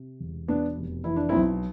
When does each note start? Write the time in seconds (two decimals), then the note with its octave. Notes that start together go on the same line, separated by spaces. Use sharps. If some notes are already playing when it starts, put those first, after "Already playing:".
Already playing: C3
0.20 E1
0.48 B2 B3 D4
0.77 F1
1.04 E3 E4
1.16 D4
1.29 B1 C4 E4